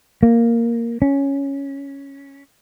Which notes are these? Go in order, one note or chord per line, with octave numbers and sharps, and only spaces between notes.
A#3
C#4